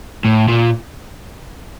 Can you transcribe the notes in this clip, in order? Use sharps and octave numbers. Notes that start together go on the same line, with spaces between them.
A2
A#2